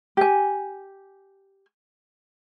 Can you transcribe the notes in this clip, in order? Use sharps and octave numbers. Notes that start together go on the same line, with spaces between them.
G4 G#5